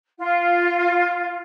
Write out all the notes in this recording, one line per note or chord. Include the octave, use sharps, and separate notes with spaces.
F4